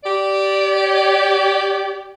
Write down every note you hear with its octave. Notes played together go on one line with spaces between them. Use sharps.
G4 D5